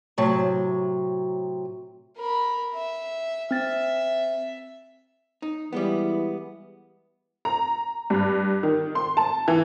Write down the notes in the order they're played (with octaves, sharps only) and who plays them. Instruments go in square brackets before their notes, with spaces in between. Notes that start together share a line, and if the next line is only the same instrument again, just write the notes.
[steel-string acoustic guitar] A2 C3 F#3
[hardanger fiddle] A#4 B5
E5
[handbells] C4 A6 [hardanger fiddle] E5
[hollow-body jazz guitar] D#4
[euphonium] E3 [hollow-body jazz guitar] G3 G#3 B3
[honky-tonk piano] A#5
G2
D#3
C6
A5
E3